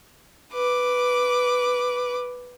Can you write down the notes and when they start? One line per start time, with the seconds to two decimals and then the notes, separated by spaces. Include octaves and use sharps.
0.52 B4 D6